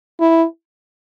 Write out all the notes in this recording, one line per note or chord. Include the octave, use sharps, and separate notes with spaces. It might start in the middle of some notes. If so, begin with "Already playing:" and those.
E4